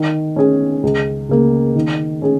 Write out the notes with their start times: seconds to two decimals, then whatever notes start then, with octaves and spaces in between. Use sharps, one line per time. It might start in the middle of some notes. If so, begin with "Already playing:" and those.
Already playing: D#3
0.36 C#4 G#4
0.83 C#2
1.29 C#3 A#3
1.75 D#3
2.22 C#4 G#4